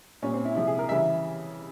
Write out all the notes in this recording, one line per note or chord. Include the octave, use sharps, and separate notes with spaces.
A#2 G3 C#4
C4
E4
C3 F3 G#3 E4
G#4
A#4
C#3 E3 G3 E5